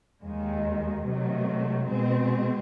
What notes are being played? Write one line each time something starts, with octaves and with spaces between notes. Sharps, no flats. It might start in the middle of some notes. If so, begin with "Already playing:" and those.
D#2 D#3 G#3
C3 D#3 F#3 A3
B2 G#3 C4